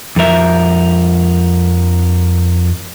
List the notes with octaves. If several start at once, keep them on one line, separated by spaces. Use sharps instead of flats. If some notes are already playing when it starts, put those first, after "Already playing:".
F2 F3 A#4 E5